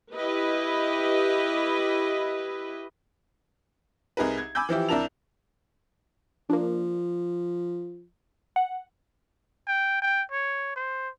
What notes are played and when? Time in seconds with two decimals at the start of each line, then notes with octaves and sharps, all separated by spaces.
0.14 E4 G4 B4 D#5
4.17 C2 D#4 G#4 A#4 B4
4.38 G#6
4.55 G#5 B5 D6 E6 G6
4.69 E3 F3 E4 G4
4.89 C2 D4 E4 A#4 A5 F7
6.50 F3 A#3 D4
8.56 F#5
9.67 G5
10.02 G5
10.32 C#5
10.76 C5